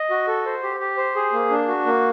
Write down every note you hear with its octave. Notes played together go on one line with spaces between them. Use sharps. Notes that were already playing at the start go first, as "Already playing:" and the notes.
Already playing: D#5
F#4
A4
C5
G4
G4
C5
G#4
A#3
D4
F#4
A#3